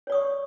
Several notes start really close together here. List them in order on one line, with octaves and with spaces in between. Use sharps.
C#5 D5 D#6 C#6